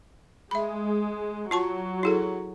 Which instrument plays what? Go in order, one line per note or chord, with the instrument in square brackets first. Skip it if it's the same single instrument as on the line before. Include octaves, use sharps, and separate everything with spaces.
[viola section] G#3 [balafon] E5 B5
[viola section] F#3 [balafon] F4 A5 C#6
[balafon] E4 G#4 A4